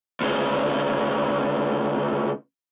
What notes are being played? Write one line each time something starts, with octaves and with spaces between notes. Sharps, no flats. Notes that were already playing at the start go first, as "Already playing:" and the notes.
D2 C#3